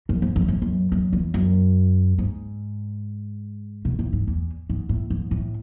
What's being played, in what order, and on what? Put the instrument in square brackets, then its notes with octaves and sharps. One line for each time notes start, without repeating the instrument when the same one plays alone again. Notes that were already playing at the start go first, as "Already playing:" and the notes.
[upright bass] F#2
G#2
F#2
G#2
F#2
F#2
E2
F#2
G#2
B2
A2
G#2
E2
G#2
A2
G#2
A2